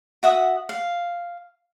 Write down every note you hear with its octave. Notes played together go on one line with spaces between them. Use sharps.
F#4 E5 F#5 D#6
F5